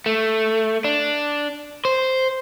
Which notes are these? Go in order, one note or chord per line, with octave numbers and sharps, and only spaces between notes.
A3
D4
C5